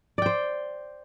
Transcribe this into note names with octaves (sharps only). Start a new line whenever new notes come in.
C5 D5 G5